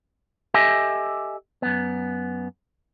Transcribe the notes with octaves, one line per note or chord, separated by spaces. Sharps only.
G4 A4 D#5 E5 G#5
F#2 B3